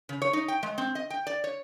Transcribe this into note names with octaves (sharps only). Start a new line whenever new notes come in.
C#3
C#5
D#4
G5
G#3
C4
D#5
G5
D5
C#5